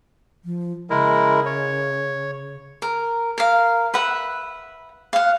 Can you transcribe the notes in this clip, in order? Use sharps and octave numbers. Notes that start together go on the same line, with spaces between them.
F3
C#3 G#3 E4 A#4
C#5
A#4
A#4 F5
B4 E5 F#5
F5 F#5